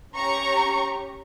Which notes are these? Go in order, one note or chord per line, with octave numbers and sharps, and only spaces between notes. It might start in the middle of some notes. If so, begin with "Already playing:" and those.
C#4 G4 A#5 C#6